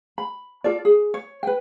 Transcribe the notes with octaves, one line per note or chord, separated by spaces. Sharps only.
B5
F4 A4 D5
G#4
C#5
B4 G5